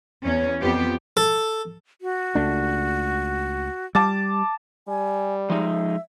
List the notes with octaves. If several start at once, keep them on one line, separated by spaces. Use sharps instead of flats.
E2 C#4
F2 B3 F4 G4
A4
F#4
C#2 A3 D4
G3 A5 D6 A6
G3 G#5
F3 G#3 D#4 E5